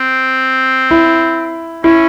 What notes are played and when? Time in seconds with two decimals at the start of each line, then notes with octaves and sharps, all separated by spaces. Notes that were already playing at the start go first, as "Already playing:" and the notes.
Already playing: C4
0.91 E4
1.84 C#4 E4